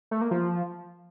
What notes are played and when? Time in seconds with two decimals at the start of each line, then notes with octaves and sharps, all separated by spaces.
0.11 A3
0.21 A#3
0.31 F3